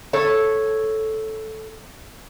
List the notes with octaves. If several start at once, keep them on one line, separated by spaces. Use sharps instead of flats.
A4 C#5